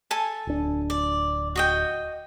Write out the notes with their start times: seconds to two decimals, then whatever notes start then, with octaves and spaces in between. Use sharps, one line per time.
0.11 A4 G#5 A5
0.47 D1 D4
0.90 D5
1.56 F#4 D#5 G5